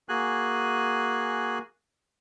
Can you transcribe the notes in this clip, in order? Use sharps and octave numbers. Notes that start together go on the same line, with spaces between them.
A#3 F#4 G#4 G#5 F#6